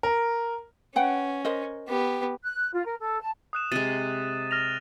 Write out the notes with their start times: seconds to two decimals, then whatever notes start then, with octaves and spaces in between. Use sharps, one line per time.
0.03 A#4
0.96 C#4 B4 F#5 G5
1.45 A#4 C5 D#5
1.88 B3 G4
2.42 F#6
2.73 F4
2.85 A#4
3.00 A4
3.20 A5
3.53 D#6 F#6 E7
3.72 C3 G#3 A6 D#7
4.51 F6 A#6 F7